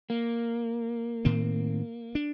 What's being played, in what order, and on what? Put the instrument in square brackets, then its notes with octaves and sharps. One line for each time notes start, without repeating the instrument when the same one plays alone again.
[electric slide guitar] A#3
[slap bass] A2 D#3 C4
D4